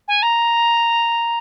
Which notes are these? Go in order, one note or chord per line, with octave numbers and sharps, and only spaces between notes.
G#5
A#5